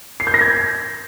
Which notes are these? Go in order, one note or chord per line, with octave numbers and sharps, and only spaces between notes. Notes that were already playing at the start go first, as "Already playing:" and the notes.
C7
G6
A#6
G#6
G6